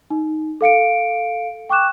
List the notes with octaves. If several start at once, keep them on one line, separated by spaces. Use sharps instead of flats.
D#4
A4 F5 C#7 D7
G5 C#6 D6 F#6 E7